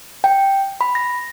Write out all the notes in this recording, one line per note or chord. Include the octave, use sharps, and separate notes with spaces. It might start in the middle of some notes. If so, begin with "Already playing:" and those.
G5
B5
A#6